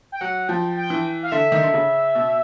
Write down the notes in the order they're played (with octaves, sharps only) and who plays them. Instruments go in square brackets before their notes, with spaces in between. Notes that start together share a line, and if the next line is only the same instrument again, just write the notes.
[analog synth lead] G5
[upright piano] F#3 [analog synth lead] F#5
[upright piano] F3 [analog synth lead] G5
[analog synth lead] G5
[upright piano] E3
[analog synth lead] F5
[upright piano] D3 [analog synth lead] E5
[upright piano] D#3
D3
C#3
B2